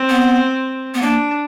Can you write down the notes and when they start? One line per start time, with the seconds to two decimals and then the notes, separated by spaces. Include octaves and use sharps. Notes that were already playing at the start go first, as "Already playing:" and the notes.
Already playing: C4
0.09 B3
0.94 B3
1.02 A#3 D4